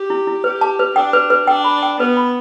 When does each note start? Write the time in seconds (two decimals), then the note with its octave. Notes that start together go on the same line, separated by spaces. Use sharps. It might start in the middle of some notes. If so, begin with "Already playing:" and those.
Already playing: G4
0.10 E4
0.27 E4
0.44 G4 B4
0.61 A5
0.79 B4
0.96 D4 G5
1.13 B4
1.30 B4
1.47 D4 G5
1.64 B5
1.83 G5
1.99 B3 B4
2.17 B5